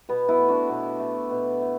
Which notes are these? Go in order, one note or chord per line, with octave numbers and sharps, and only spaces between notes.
B2 B3
B3 E4
A3
D4 F#4
B2
A3
B2
A3